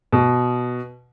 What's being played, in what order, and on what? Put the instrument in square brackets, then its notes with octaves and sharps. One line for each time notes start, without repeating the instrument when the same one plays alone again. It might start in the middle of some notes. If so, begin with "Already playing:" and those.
[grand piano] B2